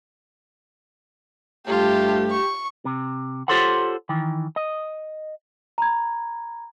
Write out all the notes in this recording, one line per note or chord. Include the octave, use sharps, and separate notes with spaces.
G2 A3 F4 G4 A5
C#6
C3
F4 G4 A4 C5 C#5 F#5
D#3 E3
D#5
A#5 B5 G#6